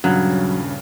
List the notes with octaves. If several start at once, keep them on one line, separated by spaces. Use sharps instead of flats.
D#1 G2 C#3 F#3